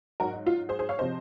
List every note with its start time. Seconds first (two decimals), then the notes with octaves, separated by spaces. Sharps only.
0.20 G#2 F#3 F#4 A#4
0.33 D#4
0.47 F4
0.69 G#4 C5
0.79 G#4 C5
0.89 C#5 F5
0.99 C3 F3 C5 D#5